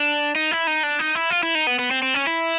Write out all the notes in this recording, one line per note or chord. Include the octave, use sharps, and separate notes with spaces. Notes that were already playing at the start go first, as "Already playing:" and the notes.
Already playing: D4
D#4
E4
D#4
D4
D#4
E4
F4
E4
D#4
B3
B3
C4
C4
C#4
E4